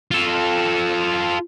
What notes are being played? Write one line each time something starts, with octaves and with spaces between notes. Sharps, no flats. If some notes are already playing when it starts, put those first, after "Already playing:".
F4 A4